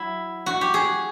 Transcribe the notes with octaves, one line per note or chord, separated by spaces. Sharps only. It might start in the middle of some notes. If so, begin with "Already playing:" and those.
Already playing: F#3 E4
F#4
G4
G#4